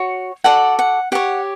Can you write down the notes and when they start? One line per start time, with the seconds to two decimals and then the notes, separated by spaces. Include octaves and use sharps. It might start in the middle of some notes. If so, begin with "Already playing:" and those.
Already playing: F#4 C#5
0.44 F#4 A4 D5 F#5
0.79 F#5
1.12 G4 C#5 F#5